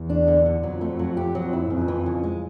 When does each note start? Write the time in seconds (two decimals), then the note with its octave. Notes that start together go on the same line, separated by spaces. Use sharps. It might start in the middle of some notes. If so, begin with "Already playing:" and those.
Already playing: E2
0.10 D4
0.28 D3
0.46 D3
0.63 F2 F#3
0.81 A3
0.99 F#3
1.17 G4
1.35 F2 F#3
1.53 E4
1.70 F2 C#3
1.88 E3
2.06 C#3
2.23 G#3